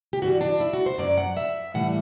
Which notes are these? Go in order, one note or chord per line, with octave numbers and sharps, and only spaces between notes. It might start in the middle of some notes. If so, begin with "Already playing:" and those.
G4
G2 E3 G3 F#4
D4
E4
F#4
C5
F#2 F#3 D5
F#5
E5
A2 E3 G3 F#5